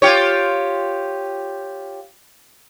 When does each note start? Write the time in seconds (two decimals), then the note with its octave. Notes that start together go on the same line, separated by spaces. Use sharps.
0.02 F4 G4 C#5